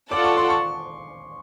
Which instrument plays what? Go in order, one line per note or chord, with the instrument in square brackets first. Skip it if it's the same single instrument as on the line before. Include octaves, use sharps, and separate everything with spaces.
[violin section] F4 A4 D5 F#5 A5 [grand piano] D6
[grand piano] C#6
C6
C#6